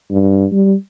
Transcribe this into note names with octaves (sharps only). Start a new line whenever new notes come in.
G2
G3